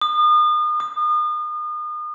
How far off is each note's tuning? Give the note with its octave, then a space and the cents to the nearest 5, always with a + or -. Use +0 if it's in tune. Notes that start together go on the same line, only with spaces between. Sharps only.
D#6 -35
D#6 -35